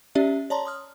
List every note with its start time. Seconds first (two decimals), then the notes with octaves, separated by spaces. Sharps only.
0.15 C#4 G4 D5 E5
0.50 C#5 D5 A5 A#5 C6
0.65 C6 D#6 F6